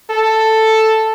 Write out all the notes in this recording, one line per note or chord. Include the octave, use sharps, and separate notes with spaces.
A4